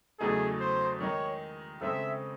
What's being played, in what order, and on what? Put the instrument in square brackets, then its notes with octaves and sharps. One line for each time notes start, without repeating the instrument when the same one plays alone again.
[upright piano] E2 C#3 F#3 A3 D#4 [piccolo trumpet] G#4
[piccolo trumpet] C5
[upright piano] D#3 G#3 D#4 [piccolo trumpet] C#5
[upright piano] C#3 G#3 C4 D#4 A4 [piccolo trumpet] E5